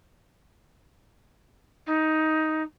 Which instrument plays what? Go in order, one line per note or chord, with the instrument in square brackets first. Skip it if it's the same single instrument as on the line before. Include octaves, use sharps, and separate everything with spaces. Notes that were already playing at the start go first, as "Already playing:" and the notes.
[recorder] D#4